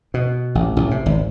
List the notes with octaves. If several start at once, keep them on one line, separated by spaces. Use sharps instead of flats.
B2
A1
A1
C3
G#1